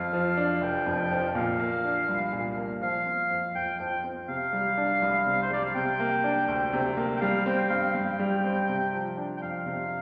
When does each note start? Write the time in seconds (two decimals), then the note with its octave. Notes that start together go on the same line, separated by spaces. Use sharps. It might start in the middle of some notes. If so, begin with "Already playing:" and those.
Already playing: F2 F5
0.13 F3
0.37 D4
0.62 F1 G5
0.86 F2
1.11 F3
1.35 A#2 F5
1.60 A#3
1.84 D4
2.09 C2
2.33 A#2
2.58 A#3
2.82 F3 F5
3.06 C4
3.31 F2
3.55 F2 G5
3.79 F3 G5
4.04 C4
4.28 C3 F5
4.53 G3
4.77 D4
5.02 C2
5.26 C3
5.42 C5
5.51 G3 D5
5.65 F5
5.75 C3 G5
6.00 A#3
6.24 D4
6.48 D2
6.73 C3
6.97 A#3
7.16 G5
7.21 G3 F5
7.46 C4 G5
7.70 G2 F5
7.95 G2 G5
8.19 G3
8.44 C4
8.69 C3
8.93 F3
9.17 D4
9.37 G5
9.42 F2 F5
9.66 C3